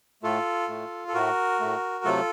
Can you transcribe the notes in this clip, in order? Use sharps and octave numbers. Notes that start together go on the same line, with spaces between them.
A2 A3 F4 A4
A2 A3
A4
A2 A3 F#4 A#4
A2 A3
C3 F#3 A3 F4 A4